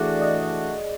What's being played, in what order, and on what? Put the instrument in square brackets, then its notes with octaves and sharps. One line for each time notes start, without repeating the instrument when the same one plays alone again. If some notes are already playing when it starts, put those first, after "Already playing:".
Already playing: [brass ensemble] E3 A3 D4 F#4 [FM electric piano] G#4 D5
[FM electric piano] D#5